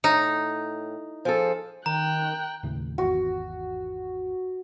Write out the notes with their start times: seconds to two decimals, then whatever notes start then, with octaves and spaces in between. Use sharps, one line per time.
0.04 A2 D#4
1.25 F3 G#4 A4
1.86 D#3 G5 A#5 F#6
2.63 D#2 A2 C#3
2.98 G#1 E2 F#4